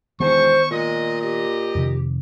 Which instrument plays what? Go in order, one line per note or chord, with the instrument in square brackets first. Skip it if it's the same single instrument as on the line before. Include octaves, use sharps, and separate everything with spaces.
[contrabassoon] E1 [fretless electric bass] D#3 B3 [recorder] C5 [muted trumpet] C#6
[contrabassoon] A#2 [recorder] G#3 [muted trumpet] D#5
[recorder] G4 [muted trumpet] D#5
[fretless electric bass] F2 C3 D#3